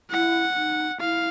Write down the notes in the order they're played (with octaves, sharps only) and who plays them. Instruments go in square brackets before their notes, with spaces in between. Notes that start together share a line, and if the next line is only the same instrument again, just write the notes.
[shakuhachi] E4 [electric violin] F#5
[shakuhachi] D#4
[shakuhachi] E4 [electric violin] F5